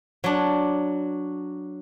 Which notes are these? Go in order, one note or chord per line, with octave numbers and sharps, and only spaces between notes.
F#3 D4